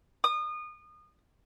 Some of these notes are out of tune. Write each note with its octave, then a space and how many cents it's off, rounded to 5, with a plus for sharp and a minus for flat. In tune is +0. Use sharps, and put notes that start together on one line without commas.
D#6 -30